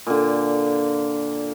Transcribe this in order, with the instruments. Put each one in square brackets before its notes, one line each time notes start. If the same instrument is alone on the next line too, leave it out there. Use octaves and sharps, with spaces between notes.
[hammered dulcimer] A#2 D3